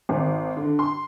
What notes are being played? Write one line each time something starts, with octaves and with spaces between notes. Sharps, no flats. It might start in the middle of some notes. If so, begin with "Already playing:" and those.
G#1
D3
C6